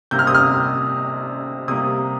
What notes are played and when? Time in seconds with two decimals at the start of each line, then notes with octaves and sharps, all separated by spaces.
0.11 C3 G3 A#3 G6
0.19 F6
0.27 D#6
0.35 F6
1.68 C3 G3 A#3 D#6